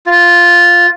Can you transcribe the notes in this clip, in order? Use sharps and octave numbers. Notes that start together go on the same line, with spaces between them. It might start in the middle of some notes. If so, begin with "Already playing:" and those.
F4